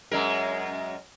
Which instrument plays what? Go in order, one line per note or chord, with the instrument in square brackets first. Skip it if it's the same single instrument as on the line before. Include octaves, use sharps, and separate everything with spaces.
[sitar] F#2 G#3 A#4